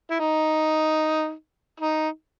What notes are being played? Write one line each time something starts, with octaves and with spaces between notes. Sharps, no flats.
E4
D#4
D#4